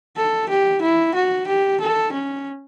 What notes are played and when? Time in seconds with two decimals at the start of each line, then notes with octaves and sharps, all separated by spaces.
0.17 A4
0.49 G4
0.82 E4
1.15 F#4
1.47 G4
1.81 A4
2.12 C#4